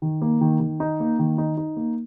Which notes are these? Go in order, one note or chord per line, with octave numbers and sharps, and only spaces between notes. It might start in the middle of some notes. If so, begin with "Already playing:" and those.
D#3
A#3
D#3
D#3
D#4
A#3
D#3
D#4
D#4
A#3